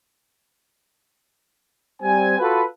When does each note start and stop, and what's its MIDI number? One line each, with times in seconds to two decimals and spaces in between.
2.02 2.37 55
2.02 2.37 60
2.02 2.37 80
2.39 2.63 65
2.39 2.63 66
2.39 2.63 69
2.39 2.63 71